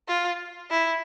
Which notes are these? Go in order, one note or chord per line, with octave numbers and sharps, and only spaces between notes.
F4
E4